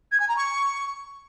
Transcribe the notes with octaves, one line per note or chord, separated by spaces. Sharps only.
G#6
G#5
A#5
C#6